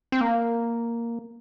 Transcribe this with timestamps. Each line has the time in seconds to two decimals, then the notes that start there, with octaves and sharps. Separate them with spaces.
0.12 C4
0.21 A#3